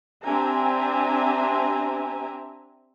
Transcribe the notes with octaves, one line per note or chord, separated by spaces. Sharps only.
C4 D4 G4 E5 G#5 A#5